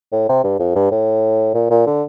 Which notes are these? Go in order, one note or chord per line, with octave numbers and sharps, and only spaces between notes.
A2
C3
G2
F2
G2
A2
A#2
A#2
D3